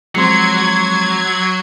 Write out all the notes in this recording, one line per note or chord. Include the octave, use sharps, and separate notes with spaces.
F3 F#3 G#3 C4 C6 G#6 C#7